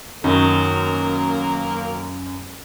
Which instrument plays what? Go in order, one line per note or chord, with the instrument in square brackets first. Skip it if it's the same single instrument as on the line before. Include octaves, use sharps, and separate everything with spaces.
[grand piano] F#2 [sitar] B2 D#3 F#3 [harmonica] A#3 A#4